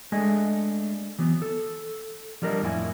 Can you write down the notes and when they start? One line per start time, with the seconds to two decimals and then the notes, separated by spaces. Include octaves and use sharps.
0.12 G#3 A3 D4 D#5 G#5
1.19 E3 F#3 B3
1.42 A4
2.42 F3 G3 D4 A#4 D#5
2.62 F2 A2 E4 G#5